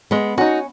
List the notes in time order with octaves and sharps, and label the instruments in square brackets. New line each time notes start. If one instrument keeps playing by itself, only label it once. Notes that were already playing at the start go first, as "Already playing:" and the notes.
[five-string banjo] G#3 [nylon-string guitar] B3
[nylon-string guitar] C#4 [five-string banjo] D#4 F#4